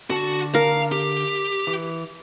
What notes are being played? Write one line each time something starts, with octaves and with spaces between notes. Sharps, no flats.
D3 F#4 A4 A5
A#4 F5
G4
E3